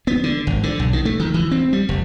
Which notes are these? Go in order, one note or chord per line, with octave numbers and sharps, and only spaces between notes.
B3
D3
G#1
D3
B1
D#3
A3
D#3
E3
C4
G3
F1